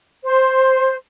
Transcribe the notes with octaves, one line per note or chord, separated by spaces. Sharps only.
C5